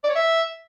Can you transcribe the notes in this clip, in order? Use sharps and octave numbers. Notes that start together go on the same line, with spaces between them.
D5
C#5
E5